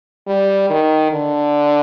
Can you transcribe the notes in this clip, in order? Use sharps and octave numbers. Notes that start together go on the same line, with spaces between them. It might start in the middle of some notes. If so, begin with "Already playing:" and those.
G3
D#3
D3